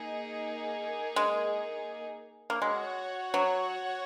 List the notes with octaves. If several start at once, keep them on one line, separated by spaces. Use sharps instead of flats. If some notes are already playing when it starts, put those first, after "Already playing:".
Already playing: A#3 D#4 G#4
G#3
A#3
G#3 F#4 C#5 F#5
F#3